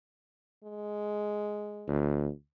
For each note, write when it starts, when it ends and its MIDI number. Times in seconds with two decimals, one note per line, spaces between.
0.64 1.95 56
1.88 2.30 38